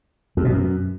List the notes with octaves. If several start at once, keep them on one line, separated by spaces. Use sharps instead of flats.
F2
B2
F#2